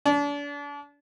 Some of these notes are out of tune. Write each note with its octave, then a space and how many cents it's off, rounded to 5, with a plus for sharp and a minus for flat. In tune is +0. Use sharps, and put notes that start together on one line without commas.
D4 -35